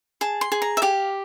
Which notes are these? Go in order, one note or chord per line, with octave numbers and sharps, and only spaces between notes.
G#4 A5
C6
G#4
A#5
E5
G4 F5